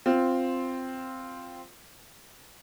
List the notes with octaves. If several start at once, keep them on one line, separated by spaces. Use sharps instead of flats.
C4 F4